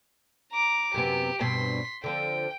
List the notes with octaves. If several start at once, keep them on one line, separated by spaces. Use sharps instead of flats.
A#5 D6
F#2 C3 B3 G4
G2 B2 C4 C6 B6
D3 F3 C4 G5